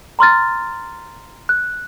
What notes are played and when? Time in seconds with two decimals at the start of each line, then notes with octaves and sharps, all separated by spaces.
0.19 A#5 C6 F6 A6
1.49 F#6